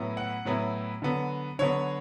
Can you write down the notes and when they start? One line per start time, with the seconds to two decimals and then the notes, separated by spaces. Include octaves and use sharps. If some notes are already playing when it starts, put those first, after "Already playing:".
Already playing: A2 F#3 B3 E4
0.17 F#5
0.45 A2 F#3 B3 E4
1.02 D3 F#3 B3
1.59 D3 F#3 B3 C#5